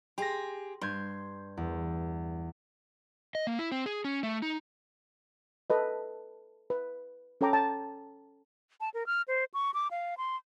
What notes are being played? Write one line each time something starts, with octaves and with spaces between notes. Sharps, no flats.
G4 G#4 C6 A#6
G2 C6 G6 G#6
E2
D#5
A#3
E4
C4
G#4
C#4
A3
D#4
A4 B4 D#5
B4
C#4 A4 C#5 G5 A#5 D6
A5
A5
A#4
F6
C5
C#6
D6
F5
C6